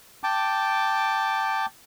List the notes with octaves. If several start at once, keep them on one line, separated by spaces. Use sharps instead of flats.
G5 A5 D6